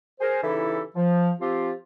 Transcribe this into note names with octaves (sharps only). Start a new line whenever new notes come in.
G#4 A#4 C5
C#3 E3 D#4 E4 G4 A4
F3
F3 C4 F4 G4